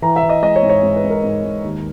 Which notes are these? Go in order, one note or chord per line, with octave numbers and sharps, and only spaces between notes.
E3 A#5
E5
E3
D#5
G#3 D#5
C#5
G#2
C#5
G#2
B4
G#2
A#4
G#2
G#2
D#2